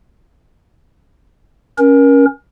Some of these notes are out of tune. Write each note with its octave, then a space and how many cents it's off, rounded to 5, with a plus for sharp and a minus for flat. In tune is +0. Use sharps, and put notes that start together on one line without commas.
C#4 +0 A#4 +30